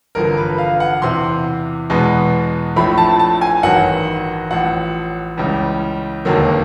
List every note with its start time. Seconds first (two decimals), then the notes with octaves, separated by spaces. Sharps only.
0.15 A1 G2 D3 F3 A#4
0.37 B4
0.58 F5
0.80 F#5
1.02 E2 C3 E3 C6
1.90 E2 B2 G#3 B3
2.76 A#1 A2 F3 A3 B5
2.98 A5
3.19 A5
3.41 G#5
3.63 A1 G2 D#3 F#3 F#5
4.51 A1 A2 F3 F#5
5.37 C#2 C#3 E3 G3
6.25 E1 D#2 D3 F#3 A#3